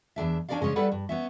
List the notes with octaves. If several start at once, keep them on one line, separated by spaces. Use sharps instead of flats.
E2 D#3 D4 E5
C#4 D4 A4 A#4 D5 F5
G#2 C#3 G#3 C#4 D4
G3 E4 A4 B4 D5 F#5
G2
B3 C#4 E5